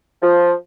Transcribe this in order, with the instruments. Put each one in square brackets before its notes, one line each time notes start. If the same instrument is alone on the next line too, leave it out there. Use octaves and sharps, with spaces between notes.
[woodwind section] F3